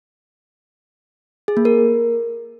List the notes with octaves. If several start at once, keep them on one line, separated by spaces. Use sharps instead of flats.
G#4
A#3
A#4